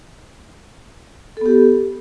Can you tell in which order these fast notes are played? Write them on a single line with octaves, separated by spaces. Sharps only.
A4 B3 G4